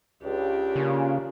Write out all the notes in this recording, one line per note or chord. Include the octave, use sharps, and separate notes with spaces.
C#2 D4 G4
C#3 A#3 C#4 F4